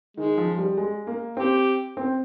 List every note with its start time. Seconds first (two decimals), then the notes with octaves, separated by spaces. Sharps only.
0.17 D#3 G#3
0.38 F3
0.58 G3
0.77 G#3
1.07 A#3
1.37 C4 G4
1.97 C4